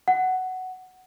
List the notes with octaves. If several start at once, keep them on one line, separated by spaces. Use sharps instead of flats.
F#5